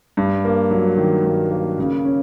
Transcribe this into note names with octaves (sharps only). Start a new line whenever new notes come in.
G2
A#3
F#3
D#3
G2
A#3
C#3
C#4